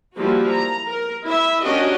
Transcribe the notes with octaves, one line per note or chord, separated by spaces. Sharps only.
F3 G3 A#3 E4 F#4
A#5
A#4
E4 E5
C#4 D4 F#4 G4 A#4 D#5